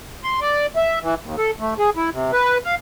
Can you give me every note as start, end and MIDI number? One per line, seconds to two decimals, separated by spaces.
0.24 0.40 84
0.41 0.66 74
0.76 0.99 76
1.02 1.15 52
1.23 1.36 39
1.38 1.51 69
1.60 1.74 57
1.79 1.90 68
1.96 2.10 64
2.12 2.31 48
2.33 2.58 71
2.65 2.75 77